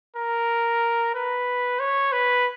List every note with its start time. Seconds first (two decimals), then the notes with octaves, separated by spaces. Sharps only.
0.16 A#4
1.15 B4
1.80 C#5
2.12 B4